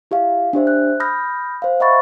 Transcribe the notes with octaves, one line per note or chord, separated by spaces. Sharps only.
E4 G4 E5 F5
D4 G4 C5 E5
F#6
B5 D#6 F6 G6 A#6
C5 F5
D#5 E5 F#5 B5 C#6 A6